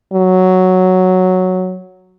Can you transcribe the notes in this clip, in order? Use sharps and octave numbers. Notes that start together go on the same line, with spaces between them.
F#3